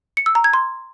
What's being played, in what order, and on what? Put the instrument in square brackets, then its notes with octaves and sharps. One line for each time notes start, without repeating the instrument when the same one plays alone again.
[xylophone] C#7
E6
A#5
G#6
C6